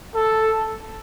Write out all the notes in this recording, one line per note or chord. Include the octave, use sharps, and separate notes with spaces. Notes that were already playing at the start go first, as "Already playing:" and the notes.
A4